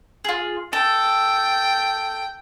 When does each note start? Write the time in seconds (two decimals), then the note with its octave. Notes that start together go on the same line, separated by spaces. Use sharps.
0.24 F4 G#4
0.73 A4 G5